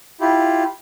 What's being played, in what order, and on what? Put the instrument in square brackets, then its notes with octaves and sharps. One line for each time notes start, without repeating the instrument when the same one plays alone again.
[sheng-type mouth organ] E4 F4 G4